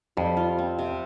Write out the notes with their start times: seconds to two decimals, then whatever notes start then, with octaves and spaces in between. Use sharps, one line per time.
0.17 F2 G3
0.37 F4
0.58 C4
0.79 C3